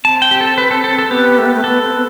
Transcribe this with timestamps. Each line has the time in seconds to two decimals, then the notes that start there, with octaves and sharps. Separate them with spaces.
0.04 C4 A5
0.22 G5
0.31 G4
0.41 A4
0.58 B4
0.71 A4
0.84 A4
0.98 A4
1.11 B3 G4
1.38 A3
1.46 B3
1.54 A3
1.64 B3 A4
1.82 C4
1.93 B3